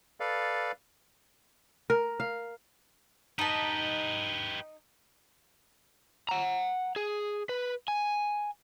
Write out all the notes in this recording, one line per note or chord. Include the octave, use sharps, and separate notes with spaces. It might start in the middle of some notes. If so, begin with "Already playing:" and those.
A4 B4 D5 F5
A#4
F5
D#4 G4 B4 A5
F#5 A#5
G#4
B4
G#5